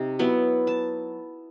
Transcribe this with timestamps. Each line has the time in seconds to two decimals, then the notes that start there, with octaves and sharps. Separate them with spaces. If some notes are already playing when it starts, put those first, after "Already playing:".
Already playing: C3 D#4
0.19 F#3 B3 E4
0.67 A5